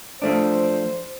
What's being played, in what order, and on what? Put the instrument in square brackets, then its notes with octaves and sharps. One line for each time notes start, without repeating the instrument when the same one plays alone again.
[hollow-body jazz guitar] F3 A3 D4 [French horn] C5